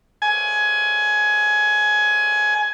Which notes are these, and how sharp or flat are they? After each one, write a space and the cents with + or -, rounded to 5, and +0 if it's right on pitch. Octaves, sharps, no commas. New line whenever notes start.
G#5 +20